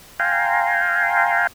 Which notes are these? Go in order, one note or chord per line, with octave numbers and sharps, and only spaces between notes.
F5 G5 G#5 A#5 C6